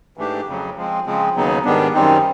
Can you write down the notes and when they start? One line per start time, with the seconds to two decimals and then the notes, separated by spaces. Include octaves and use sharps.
0.17 G#2 E3 A3 D4 G4
0.47 F2 C#3 F#3
0.76 F3 G#3 C4
1.06 C#3 F3 G#3 C4
1.35 D#2 C#3 F#3 B3 D#4
1.65 G#2 D#3 G3 B3 D4
1.94 F#2 D#3 G3 C4 D#4